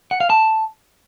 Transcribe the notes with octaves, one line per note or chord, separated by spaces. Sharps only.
F#5
F5
A5